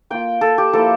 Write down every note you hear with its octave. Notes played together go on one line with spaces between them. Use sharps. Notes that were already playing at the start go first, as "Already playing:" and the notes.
A#3 F4 G5
A4
G4
F3 A#3 E4 A4